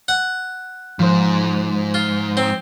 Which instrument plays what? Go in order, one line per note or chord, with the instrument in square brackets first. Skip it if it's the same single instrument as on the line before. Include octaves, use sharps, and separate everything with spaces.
[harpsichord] F#5
[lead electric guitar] G#2 [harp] F3 C5
[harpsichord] F4
C4